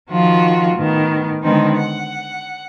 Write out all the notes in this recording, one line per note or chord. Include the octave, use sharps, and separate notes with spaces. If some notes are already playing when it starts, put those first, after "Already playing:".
D#3 F3 F4 F#4
A2 D#3 B3
D3 D#3 G#3 B3 C4 D#4
F#5